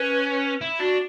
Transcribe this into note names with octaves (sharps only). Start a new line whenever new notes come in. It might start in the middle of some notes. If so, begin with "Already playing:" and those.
Already playing: C#4 B4
E4
D4 F#4